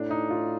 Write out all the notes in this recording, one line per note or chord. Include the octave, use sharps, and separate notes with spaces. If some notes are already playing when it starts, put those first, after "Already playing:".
Already playing: A2 D4
D#4
F4